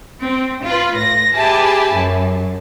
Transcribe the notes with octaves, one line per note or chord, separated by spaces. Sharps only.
C4
F4 B4
A2 A#6
G4 G#4 B4 E5 G#5 A5
F#2